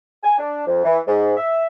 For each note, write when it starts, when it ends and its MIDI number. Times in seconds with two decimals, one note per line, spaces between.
0.23 0.36 80
0.38 0.63 62
0.67 0.84 41
0.84 0.99 52
1.07 1.32 44
1.37 1.67 76